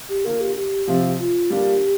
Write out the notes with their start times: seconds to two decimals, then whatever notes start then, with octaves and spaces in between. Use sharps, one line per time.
0.09 G4
0.25 D3 A#3 F4 A#4
0.41 G4
0.56 G4
0.87 C3 F3 C4 F4
1.19 F4
1.50 D3 G3 A#3 D4 F4 G4